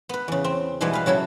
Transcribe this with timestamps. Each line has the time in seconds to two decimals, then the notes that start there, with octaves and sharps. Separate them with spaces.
0.09 B3 B4
0.28 E2 C#3
0.44 C4
0.81 B2 E3 G3 G#3 B3
0.93 B4 F5
1.06 C#3 F#3 E4 A4